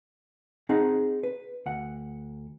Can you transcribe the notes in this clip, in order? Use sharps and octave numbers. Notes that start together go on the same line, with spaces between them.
C4 D#4 G#4 F#5
B4
D2 F#5